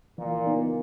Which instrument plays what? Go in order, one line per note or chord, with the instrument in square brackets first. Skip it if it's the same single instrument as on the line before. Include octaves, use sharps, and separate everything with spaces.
[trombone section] A#2 [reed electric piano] E3
[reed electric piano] B3 D#4 A#4